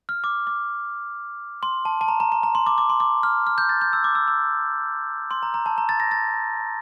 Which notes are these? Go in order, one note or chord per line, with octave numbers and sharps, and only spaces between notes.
F6
D6
D6
C6
A5
A5
A#5
A#5
A#5
A#5
C6
D6
D6
C6
D6
F6
F6
G6
A6
G6
E6
D6
E6
E6
C6
A#5
A#5
A5
A#5
A6
A#6
A6